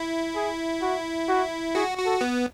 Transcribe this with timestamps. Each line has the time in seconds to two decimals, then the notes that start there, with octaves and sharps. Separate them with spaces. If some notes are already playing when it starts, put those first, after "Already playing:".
Already playing: E4
0.35 G#4
0.82 F#4
1.28 F#4
1.75 F#4 G#4
1.98 F#4
2.06 A4
2.21 B3